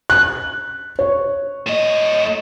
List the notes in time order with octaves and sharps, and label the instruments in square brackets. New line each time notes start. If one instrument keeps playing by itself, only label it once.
[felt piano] F#6
C#5
[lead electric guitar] A2 D#5